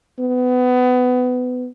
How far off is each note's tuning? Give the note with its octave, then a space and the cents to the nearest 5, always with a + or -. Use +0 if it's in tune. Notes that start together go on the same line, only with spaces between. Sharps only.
B3 +25